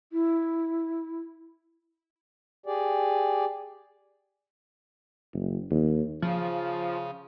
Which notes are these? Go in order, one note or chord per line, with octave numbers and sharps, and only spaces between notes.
E4
G4 G#4 D5
F#1
D#2
C#3 F3